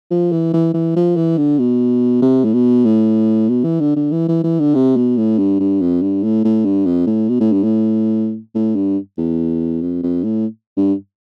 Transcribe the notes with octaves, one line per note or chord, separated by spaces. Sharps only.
F3
E3
E3
E3
F3
E3
D3
B2
C3
A2
B2
A2
B2
E3
D3
D3
E3
E3
E3
D3
C3
B2
A2
G2
G2
F2
G2
A2
A2
G2
F2
A2
B2
A2
G2
A2
A2
G2
E2
F2
F2
A2
G2